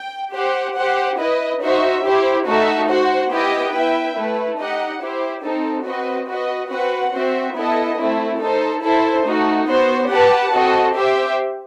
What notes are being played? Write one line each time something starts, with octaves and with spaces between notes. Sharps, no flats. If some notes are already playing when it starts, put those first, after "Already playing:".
Already playing: G5
G4 C5 F#5
G4 C5 F#5
E4 B4 D#5
D#4 F#4 C5 E5
E4 G4 C5
A3 D#4 F#4 A4 E5
F#4 C5 F#5
B3 E4 G4 D#5 G5
E4 B4 E5 G5
A3 E4 B4
D#4 G4 D#5 F#5
E4 G4 C5
C4 D#4 A4
C4 F#4 B4 D#5
F#4 B4 D#5
C4 F#4 B4 F#5
C4 F#4 C5 E5
B3 E4 A4 D#5
A3 C4 E4
D#4 A4 C5
E4 A4 C5
A3 D#4 F#4
B3 F#4 C5
G4 B4 F#5 A5
C4 F#4 A4 D#5
G4 C5 E5 G5